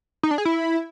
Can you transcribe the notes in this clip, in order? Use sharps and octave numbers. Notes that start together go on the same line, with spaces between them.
D#4
D4
G#4
E4